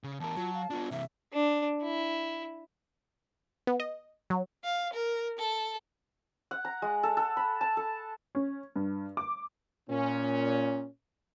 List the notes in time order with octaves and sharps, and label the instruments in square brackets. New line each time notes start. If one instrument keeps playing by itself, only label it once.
[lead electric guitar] C#3
[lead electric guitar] E2 A#4 [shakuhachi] A5
[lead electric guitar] F#3 [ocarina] F4
[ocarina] F5
[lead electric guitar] B3 D4 [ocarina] F4
[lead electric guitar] C3 E3 [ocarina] E5
[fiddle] D4
E4
[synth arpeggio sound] B3
D#5
F#3
[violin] F5
A#4
A4
[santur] F#5
A#5
G#3
A4
A4
B5
A5
A4
[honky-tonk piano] C#4
G2
D6
[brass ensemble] A#2 C#4